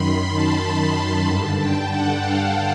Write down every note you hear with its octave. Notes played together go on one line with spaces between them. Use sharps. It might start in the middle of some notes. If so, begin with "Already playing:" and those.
Already playing: F#2 D#3 B5 C6
A5
B5
B5
G2 D3 A5
G5
F#5
F5